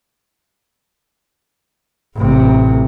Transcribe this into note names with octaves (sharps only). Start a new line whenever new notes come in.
A1 C3